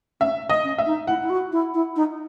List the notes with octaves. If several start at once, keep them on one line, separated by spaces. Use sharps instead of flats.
C#4 E5
D#5
C#4
E5
D#4
E4 F#5
E4
F#4
E4
E4
D#4